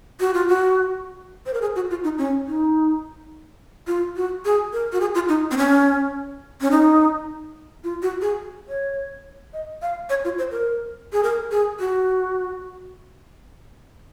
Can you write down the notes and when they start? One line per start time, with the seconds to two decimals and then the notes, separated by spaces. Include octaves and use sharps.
0.20 F#4
0.34 F4
0.48 F#4
1.46 C5
1.54 A#4
1.61 G#4
1.76 F#4
1.90 F4
2.04 D#4
2.18 C#4
2.47 D#4
3.87 F4
4.16 F#4
4.45 G#4
4.73 A#4
4.93 F#4
5.01 G#4
5.14 F4
5.29 D#4
5.51 C4
5.58 C#4
6.61 C#4
6.71 D#4
7.84 F4
8.02 F#4
8.21 G#4
8.69 C#5
9.53 D#5
9.82 F5
10.10 C#5
10.24 F4
10.38 C5
10.52 A#4
11.13 G#4
11.23 A#4
11.51 G#4
11.80 F#4